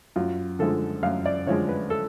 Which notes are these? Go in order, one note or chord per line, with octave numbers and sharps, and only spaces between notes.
F#2 F4
D3 F3 G#3 A4
F#2 F5
D5
D3 F3 G#3 C#5
B4
A4